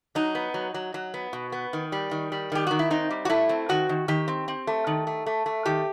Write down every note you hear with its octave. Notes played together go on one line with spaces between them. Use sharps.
F#3 D#4
B3
F#3
F#3
F#3
B3
B2
B3
D#3
G3
D#3
G3
D#3 G4
D#3 F#4
E4
C4 D#4
G3
F#4
A3 E4
C4
D#3 F#4
D#3
D#3 G4
C4
C4
A3
D#3
A3
A3
A3
D#3 G4